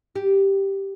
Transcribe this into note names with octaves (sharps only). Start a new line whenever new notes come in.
G4